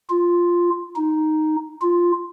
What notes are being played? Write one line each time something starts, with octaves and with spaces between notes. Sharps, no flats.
F4
D#4
F4